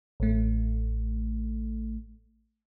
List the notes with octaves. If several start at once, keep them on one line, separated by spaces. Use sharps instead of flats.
A1 A3